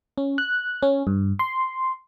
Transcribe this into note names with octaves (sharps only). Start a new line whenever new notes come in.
C#4
F#6
C#4
G2
C6